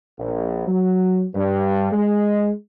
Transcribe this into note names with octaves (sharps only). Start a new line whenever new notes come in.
A#1
F#3
G2
G#3